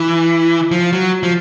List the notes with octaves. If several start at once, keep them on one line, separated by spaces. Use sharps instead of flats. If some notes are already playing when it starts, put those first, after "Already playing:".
Already playing: E3
F3
F#3
F3